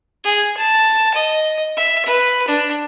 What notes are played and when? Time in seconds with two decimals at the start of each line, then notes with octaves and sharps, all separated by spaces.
0.24 G#4
0.57 A5
1.14 D#5
1.77 E5
2.05 B4
2.48 D4